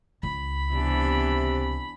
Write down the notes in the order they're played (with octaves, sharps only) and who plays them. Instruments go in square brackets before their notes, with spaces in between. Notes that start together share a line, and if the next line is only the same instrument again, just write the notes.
[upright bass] C#2 [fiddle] B5
[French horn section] C3 [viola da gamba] E3 B3 D4